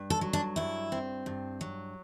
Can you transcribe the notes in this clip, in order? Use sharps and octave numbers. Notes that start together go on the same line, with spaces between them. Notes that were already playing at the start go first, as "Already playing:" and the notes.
Already playing: G2
A4
F#3
D4
G2 E4
C4
G2
F#3